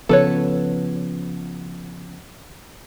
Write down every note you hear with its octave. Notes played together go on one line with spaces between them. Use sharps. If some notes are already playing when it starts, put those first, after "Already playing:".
C#3 F3 B3 A4 B4 C#5